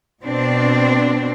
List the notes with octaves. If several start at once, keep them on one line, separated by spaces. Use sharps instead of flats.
B2 C4 D4